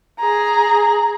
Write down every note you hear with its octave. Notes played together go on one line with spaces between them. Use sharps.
G#4 A#5